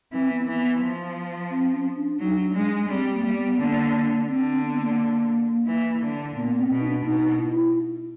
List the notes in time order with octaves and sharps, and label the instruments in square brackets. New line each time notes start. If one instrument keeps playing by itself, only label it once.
[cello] E3 [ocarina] C4
[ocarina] B3
[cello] E3 [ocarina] B3
[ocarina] B3
[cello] F3
[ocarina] C4
C#4
D4
[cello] F#3 [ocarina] D#4
[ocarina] D4
[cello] G#3 [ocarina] D4
[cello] G3 [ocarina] C4
[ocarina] A#3
[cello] G3
[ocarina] B3
[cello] D3 [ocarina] A#3
[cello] D3 [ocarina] C4
[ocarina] C4
B3
A#3
[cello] E3
D3
[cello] A#2 [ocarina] B3
[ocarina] C4
[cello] B2
[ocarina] D#4
D4
[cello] B2 [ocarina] D#4
[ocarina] E4